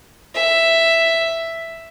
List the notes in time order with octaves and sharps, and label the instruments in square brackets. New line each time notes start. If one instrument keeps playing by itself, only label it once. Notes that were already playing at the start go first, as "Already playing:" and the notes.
[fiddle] E5